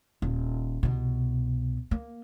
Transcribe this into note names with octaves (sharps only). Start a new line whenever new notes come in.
D#1
C2 B2
A#3